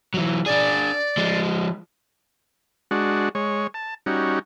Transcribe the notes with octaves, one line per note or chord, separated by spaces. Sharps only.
E3 F#3
D4 G#4 D5
F3 G#3
G#3 D4 F#4
G#3 C#5
A5
G3 C#4 D#4 F#4